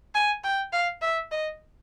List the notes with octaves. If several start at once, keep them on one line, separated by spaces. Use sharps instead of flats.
G#5
G5
F5
E5
D#5